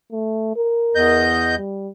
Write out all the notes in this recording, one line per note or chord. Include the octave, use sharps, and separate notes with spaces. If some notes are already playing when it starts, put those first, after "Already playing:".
A3
A#4
E2 D#5 G6
G3